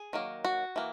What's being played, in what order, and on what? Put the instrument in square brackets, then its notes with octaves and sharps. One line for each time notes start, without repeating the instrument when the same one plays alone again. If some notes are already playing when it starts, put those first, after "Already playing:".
Already playing: [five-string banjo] G#4
D#3 F#3 A#3
F#4
E3 A#3